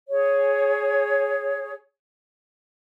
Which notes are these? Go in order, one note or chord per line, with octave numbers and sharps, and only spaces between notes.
G#4 C#5